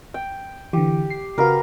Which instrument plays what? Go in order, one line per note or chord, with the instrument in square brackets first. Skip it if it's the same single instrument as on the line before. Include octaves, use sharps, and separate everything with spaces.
[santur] G5
[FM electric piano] D3 E3 [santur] G4
[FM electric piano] C7
[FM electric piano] C#3 F#4 [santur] A#4 B4 F5